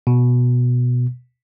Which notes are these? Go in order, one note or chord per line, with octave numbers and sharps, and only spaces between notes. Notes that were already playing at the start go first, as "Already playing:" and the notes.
B2